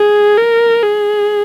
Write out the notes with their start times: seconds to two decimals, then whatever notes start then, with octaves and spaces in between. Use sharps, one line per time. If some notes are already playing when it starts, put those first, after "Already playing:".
Already playing: G#4
0.38 A#4
0.83 G#4